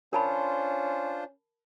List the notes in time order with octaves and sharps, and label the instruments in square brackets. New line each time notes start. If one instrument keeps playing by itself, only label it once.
[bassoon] C#4 [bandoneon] D4 F4 C5 [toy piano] A#4 A5 B5